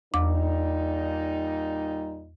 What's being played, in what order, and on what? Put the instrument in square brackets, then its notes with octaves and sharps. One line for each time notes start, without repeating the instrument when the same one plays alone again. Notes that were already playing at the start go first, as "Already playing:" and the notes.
[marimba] E2 D6 [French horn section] A#2 G3 D#4